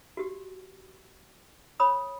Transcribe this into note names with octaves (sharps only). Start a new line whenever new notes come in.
F#4 G4
C#5 B5 D#6